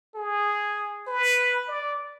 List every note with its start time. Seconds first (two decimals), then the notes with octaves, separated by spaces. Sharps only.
0.15 G#4
1.07 B4
1.68 D5